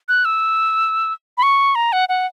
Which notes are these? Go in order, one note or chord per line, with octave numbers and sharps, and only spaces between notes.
F#6
E6
B5
C#6
A#5
F#5
F#5